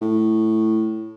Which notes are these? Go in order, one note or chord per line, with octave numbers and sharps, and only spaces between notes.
A2